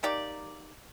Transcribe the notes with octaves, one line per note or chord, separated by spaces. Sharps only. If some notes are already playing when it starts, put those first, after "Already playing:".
A#3 D#4 G4 D5